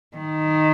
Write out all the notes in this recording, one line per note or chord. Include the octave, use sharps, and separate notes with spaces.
D#3